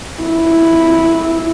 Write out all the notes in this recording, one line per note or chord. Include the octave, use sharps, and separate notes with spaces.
E4